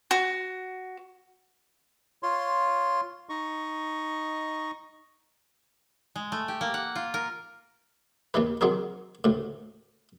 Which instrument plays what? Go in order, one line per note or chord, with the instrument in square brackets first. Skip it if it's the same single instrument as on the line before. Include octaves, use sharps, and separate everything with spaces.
[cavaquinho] F#4
[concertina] F4 C#5 C6
D#4 D#5 C#6
[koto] G#3
A3
G4
A#3
F#5
F4
A#4
[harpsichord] D#2 D#3 E3 B4
D#3 F#3 C4 G#4 A#4
D2 A2